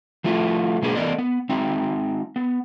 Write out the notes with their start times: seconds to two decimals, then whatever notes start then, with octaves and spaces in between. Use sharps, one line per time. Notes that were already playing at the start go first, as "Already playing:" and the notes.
0.24 F3 A3 E4 F4
0.82 B2 G#3 A#3 D4 G#4 B4
0.95 E3 A3 B3 A#4 D5 D#5
1.18 B3
1.49 G#3 C4 D#4 E5
2.36 B3